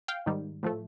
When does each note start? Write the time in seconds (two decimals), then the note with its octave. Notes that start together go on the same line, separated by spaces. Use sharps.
0.08 F5 G5
0.26 G#2 D#3 G3
0.63 A2 F3 A3